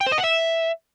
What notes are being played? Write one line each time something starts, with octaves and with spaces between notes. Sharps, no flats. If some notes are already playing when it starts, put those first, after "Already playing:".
G5
C5
D#5
F#5
E5